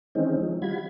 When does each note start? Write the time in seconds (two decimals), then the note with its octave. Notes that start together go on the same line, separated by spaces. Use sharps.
0.15 D#3 E3 G#3 C4 C#4 D#4
0.41 F3
0.62 G3 F4 F#4 B5 G#6